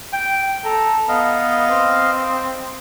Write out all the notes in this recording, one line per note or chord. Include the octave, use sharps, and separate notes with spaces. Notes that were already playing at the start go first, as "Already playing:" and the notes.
G5
A4 A#5
B3 D#5 F5
C4